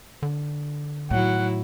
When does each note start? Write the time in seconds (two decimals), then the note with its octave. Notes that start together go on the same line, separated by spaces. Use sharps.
0.23 D3
1.11 A2 D#3 F#3 E4 F#5